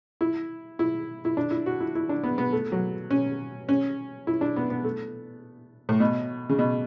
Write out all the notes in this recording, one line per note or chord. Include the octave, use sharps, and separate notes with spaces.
E4
E4
E4
D4
E4
F#4
E4
E4
D4
B3
B3
A3
F#3
C#4
C#4
E4
D4
B3
B3
A3
A2
B2
C#3
B2